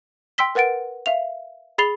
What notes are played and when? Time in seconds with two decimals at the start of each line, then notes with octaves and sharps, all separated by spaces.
0.38 G5 C6 E6 B6 G7
0.55 A#4 B4 F#5 A6 D7
1.06 E5 F5 F7
1.78 G#4 B5 A6 C7 F7 G7